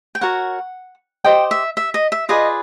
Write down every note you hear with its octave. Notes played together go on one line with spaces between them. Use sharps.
G5
F#4 A#4 C#5 F#5
G4 C5 D#5 G5
E5
E5
D#5
E5
F4 G#4 B4 D5 D#5